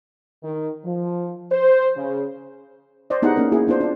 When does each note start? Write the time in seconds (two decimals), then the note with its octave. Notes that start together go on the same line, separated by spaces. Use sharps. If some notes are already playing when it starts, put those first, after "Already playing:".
0.44 D#3
0.85 F3
1.52 C5
1.97 C#3
3.10 C5 D5 D#5
3.22 B3 D#4 E4 G4 G#4 F#5
3.36 A#3 C#4 A#4
3.52 A#3 E4 F#4 G#4
3.67 B3 D4 F4 C5
3.80 D4 F4